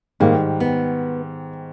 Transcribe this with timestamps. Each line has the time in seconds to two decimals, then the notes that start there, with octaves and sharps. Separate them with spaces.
0.20 G#2 D#3 G3 A#3
0.60 B3